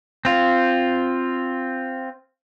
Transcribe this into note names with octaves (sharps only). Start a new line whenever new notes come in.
C4 F4